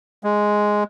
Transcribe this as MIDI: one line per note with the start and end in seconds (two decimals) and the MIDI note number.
0.24 0.84 56